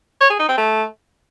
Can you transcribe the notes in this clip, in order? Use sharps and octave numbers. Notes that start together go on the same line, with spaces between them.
C#5
G#4
D#4
C4
A3